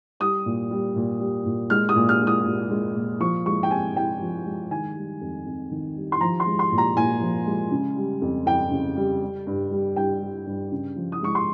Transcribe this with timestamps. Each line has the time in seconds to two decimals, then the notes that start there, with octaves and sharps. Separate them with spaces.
0.20 G3 D#6
0.46 A#2
0.71 G3
0.96 A#2
1.20 G3
1.46 A#2
1.70 G#3 F6
1.89 D#6
1.96 A#2
2.09 F6
2.21 G#3
2.27 D#6
2.46 A#2
2.71 G#3
2.96 A#2
3.20 F3 C#6
3.46 G#3 C#6
3.63 G5
3.71 C3 G#5
3.96 C3 G5
4.21 F3
4.46 G#3
4.71 D#3 G#5
4.96 G3
5.21 F2
5.46 F2
5.71 D#3
5.96 G3
6.12 C6
6.21 F3 A#5
6.40 C6
6.46 G#3
6.59 C6
6.72 A#2
6.78 A#5
6.96 A#2 G#5
7.21 F3
7.46 G#3
7.71 C#3
7.96 G3
8.22 F2
8.46 F2 G5
8.71 C#3
8.97 G3
9.21 G3
9.47 G2
9.71 G3
9.96 G2 G5
10.22 G3
10.47 G2
10.72 C#3
10.96 F3
11.12 D#6
11.22 G#3 C#6
11.35 C6